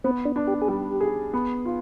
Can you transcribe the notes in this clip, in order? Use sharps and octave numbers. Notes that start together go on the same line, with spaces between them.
B3 C4
D4
D4
G4
G#4
G3 G4
G#4
B3
F4